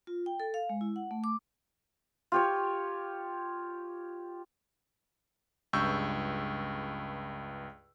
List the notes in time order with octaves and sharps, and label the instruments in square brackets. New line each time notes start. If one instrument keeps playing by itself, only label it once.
[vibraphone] F4
G5
A4
F5
G#3
E4
F#5
A3
D6
[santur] F4 G4 C#5
[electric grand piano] C#2 G2 C#6 E6 G6